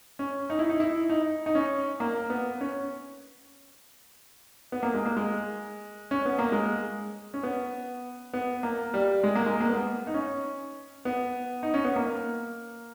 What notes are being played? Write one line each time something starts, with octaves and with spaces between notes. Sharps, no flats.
C#4
D#4
E4
D#4
E4
D#4
D#4
C#4
A#3
B3
C#4
B3
A#3
G#3
A#3
G#3
C#4
B3
A#3
G#3
C#4
B3
B3
A#3
G3
G#3
A#3
G#3
A#3
B3
D#4
C#4
B3
D#4
C#4
B3
A#3